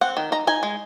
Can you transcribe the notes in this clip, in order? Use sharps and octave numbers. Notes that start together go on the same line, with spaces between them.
C4 F#5
D#3
D#4 A#5
D#4 G#5
G#3